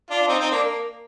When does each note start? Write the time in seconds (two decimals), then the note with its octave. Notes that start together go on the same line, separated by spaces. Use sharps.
0.10 D4 F4
0.21 D4
0.28 C4 D#4
0.39 C4 D#4
0.51 A#3 D4
0.63 A#3